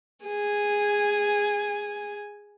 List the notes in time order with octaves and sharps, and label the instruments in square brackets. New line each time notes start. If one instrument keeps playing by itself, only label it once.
[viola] G#4 G#5